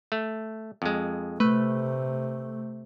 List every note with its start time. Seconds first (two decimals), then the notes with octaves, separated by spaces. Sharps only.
0.12 A3
0.82 F2 G#3
1.40 C3 A3 B4